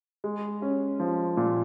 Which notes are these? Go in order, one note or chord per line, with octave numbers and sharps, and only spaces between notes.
G#3
C#4
F3
A#2